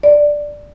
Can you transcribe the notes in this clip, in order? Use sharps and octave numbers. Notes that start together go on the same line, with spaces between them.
D5